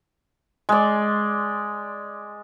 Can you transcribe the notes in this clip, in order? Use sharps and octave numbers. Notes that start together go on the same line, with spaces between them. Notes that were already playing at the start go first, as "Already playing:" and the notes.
G#3 D5